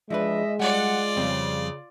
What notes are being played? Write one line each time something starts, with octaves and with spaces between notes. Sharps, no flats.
E2 F3 G#3 D4 B4 D#5 E5
G3 F4 D5 F#5
F2 C#3 G3 C4